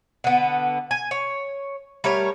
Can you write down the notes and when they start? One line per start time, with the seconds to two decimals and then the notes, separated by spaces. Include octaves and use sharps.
0.24 D3 B3
0.91 G#5
1.11 C#5
2.04 G3 A3 A#4 C#5